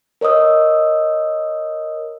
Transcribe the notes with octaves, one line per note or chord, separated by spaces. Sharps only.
A#4 C#5 D#5 D#6 E6